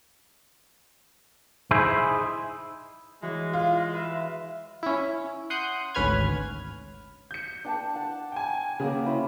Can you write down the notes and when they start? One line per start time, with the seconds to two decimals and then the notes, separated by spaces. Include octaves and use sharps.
1.71 D#4 E4 G#4 C5
3.22 E3 G#3 F#4 C#5
3.53 F4
3.94 B4 E5
4.83 C#4 E4
5.50 F#5 C6 D#6 F#6 G6
5.95 G#1 D2 C#4 B4 F6 G#6
7.31 G6 C#7
7.65 D4 G5 A5
7.95 F#5 A5
8.32 G5 G#5
8.80 C#3 F#3 A#3 G5 D6
9.06 C#4 E4 C5